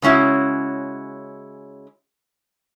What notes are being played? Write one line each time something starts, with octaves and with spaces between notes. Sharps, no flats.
C#3 G#3 C#4 E4 F#4